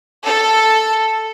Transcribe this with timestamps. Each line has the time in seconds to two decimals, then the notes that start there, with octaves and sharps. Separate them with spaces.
0.25 A4